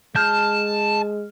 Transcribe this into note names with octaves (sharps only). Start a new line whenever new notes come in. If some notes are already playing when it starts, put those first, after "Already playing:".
G#3 A5 F6 G6